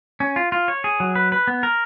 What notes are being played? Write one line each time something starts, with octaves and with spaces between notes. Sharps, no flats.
C#4
F4
F4
C#5
G#4
F#3
B4
B4
B3
A#4